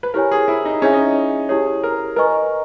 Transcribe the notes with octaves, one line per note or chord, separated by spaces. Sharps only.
B4
E4 G4 A#4 C#5 G#5
G#4
E4
D#4
C#4 E4 G#4 C#5 E5 G#5
D#4
E4 G4 G#4 C#5
A#4
A#4 B4 D#5 G#5 C#6